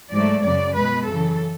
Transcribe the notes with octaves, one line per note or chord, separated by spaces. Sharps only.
G#2 F#3 A3 D5
F#2 C#3 F#3 D5
B2 G#3 B4
F#2 C#3 E3 A4